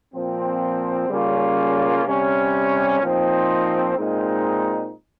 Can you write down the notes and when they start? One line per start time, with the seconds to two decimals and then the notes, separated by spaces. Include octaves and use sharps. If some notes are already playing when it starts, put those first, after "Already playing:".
0.13 A#2 F3 C4
1.10 C#3 G3 A#3 C#4 F4
2.05 C3 G3 C#4
3.02 A#2 F3 C4 D#4
3.98 A#2 G#3 C4 D#4